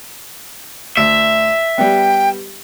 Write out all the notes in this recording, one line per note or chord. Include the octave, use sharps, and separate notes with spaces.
D2 E5
G3 B3 G5